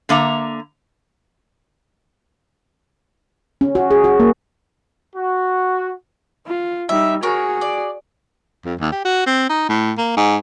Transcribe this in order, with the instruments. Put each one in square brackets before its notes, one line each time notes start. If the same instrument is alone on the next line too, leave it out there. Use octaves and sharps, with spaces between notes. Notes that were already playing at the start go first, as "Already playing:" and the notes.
[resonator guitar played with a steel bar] D3 A#3 E5 A#5
[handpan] C#4
F#4
G#4
F#4
A#3
[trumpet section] F#4
[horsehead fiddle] F4
[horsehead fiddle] G3 D#4 [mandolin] E5
[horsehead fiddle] F#4 G#4 [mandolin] A#4 C#5
[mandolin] D5
[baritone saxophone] F2
D#2
G4
F#4
C4
D#4
A2
A#3
G#2